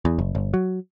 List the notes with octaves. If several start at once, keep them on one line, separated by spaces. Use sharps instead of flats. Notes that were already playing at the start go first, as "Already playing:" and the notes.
E2
F#1
G1
F#3